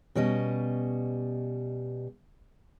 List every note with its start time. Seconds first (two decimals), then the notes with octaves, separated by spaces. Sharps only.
0.15 B2 G3 C#4 D#5